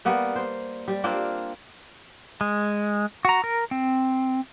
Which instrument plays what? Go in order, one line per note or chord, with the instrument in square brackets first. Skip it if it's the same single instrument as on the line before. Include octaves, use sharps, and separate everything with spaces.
[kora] G3 A#3 B3
C5
G3
A#3 C4 D4 F4
[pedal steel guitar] G#3
F#4 A#5
A#4
C4